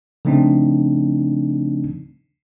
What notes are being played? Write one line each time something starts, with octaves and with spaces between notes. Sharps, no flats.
C#3 F3 A3 C4 D4 D#4